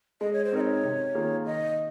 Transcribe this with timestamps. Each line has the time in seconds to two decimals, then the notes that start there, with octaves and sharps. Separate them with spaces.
0.21 G#3 D#5
0.33 C#5
0.45 C5
0.52 C4 D#4 A#4 D#5
0.61 C#5
0.83 C3
1.15 D#3 A#3 F4 G#4
1.46 D#3 D#5